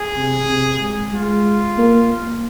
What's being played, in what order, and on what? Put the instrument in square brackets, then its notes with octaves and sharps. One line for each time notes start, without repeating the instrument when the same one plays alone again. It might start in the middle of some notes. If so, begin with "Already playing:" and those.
Already playing: [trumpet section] G#4
[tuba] C3
C3
G#3
[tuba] G#3 [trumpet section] F4
[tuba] A#3
A#3